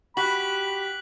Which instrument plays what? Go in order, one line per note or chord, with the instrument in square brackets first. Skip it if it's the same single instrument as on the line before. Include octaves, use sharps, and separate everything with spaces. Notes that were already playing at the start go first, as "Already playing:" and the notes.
[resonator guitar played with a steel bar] F#4 [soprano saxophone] G4 [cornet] B5 [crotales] F#6 B6 F#7